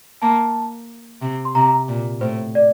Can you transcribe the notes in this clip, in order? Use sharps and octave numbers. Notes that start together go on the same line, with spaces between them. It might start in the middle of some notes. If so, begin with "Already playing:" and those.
A#3 A5
C3
C6
C3 A#5
A#2
A2 C5
D5